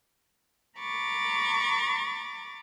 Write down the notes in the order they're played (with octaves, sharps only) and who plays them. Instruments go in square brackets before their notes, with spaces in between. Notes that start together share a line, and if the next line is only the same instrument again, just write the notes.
[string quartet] A#5 B5 C#6 D6 A6